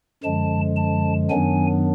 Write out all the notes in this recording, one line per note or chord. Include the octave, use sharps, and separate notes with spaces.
F#2 D3 F3 G#3 A5
A5
F#2 D#3 F#3 B3 D4 G#5